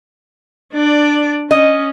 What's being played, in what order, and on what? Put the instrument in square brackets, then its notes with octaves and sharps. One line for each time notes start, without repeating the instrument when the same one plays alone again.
[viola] D4 D5
[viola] C#4 [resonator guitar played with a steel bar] D#5